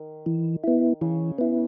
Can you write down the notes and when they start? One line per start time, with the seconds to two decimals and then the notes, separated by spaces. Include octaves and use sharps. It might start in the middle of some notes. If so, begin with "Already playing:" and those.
Already playing: D#3
0.26 E3
0.64 B3 E4
1.01 C#3 E3
1.38 B3 E4